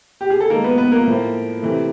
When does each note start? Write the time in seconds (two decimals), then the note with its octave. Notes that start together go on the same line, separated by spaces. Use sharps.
0.21 G4
0.30 G#4
0.40 A4
0.50 D#3 G#3 A#3 A#4
0.64 B3 B4
0.78 B3 B4
0.92 A#3 A#4
1.06 A2 F3 A#3
1.62 C3 E3 A3